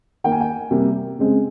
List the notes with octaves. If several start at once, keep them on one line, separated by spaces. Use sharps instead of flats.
D#3 A#3 G5
G#5
G5
C3 G3 A#3
C#3 G#3 C4